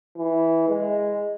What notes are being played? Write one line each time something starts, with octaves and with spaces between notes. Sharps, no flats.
E3
G#3